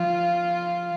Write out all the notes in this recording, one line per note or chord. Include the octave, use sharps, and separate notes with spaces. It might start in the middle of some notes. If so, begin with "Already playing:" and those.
Already playing: F3 F4